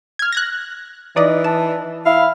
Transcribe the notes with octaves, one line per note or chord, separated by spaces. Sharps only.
F6 G#6
F#6 G#6 A#6
E3 D#4 D5 D#5
A5
E4 F5